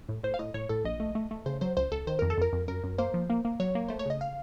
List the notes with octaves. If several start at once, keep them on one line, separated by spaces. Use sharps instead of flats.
A2
A2 C5
F5
A2 D#5
A2 C#5
A2 A4
A#1 D#5
A3
A3
A3
C#3 C5
F#3 C5
C#2 C5
C#2 A4
D#3 C5
F2 A#4
A4
F2 A#4
F2
F#2 A#4
F#2
A#3 C5
F3
A#3
A#3
F#3 C#5
A#3
A3 C5
C#5
C#3 D#5
F5